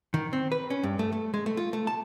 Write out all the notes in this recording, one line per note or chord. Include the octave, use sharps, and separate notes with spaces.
D#3
C4
B4
C#4
G2
A3
A3
G#3
A3
F4
A3
A5